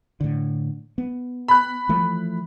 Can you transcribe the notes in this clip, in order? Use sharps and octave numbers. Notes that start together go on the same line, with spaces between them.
A2 D3
B3
B5 F#6
E3 F3 A3